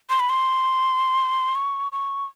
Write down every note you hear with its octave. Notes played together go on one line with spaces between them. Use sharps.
C6
B5
C6
C#6
C#6